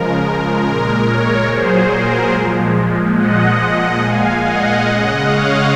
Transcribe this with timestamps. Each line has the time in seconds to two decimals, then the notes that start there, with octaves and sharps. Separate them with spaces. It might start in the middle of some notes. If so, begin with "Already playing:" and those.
Already playing: C#3 F3 G#3 A#4
0.63 A#2 G#3 A#4
1.06 A#4 C#5
1.47 A#2 F#3 G#4 C5
1.90 A#4
2.32 A#2 F3 G#3
3.15 A#2 F3 G#3 D#5 F#5
4.00 A#2 G#3 F5 G#5
4.42 D#5 F#5
4.85 C#3 G#3
5.26 C#5 F5